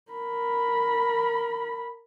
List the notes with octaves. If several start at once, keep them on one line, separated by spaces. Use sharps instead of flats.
A#4 B5